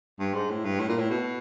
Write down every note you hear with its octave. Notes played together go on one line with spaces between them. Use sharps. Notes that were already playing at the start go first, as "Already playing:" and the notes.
G2
G#2
A2
G2
A2
A#2
A2
B2